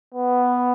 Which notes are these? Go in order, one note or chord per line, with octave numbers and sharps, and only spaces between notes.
B3